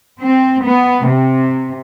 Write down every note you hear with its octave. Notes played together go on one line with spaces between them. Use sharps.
C4
B3
C3